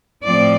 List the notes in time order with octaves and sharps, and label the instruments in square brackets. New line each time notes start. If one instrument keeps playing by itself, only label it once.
[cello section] A2 F3 A3 C4 D5